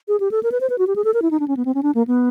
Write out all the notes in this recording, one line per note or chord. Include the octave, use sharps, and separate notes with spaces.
G#4
G4
A4
A#4
B4
C5
B4
F#4
G4
G#4
A4
A#4
E4
D#4
D4
C#4
B3
C4
C#4
D4
A#3
B3